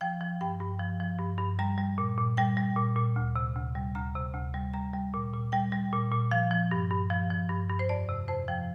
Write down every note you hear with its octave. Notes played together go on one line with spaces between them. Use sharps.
F3 G5
F3
G2 G5
G2
F3
F3
G2
G2
G3 A#5
G3
A#2
A#2
G3 G5
G3
A#2
A#2
D2
C3
D2
G3
D2 A#5
C3
D2
G3
G3 A#5
G3
A#2
A#2
G3 G5
G3
A#2
A#2
F3 F5
F3
G2
G2
F3
F3
G2
G2
C5
F2 D5
C3
F2 C5
F3 G5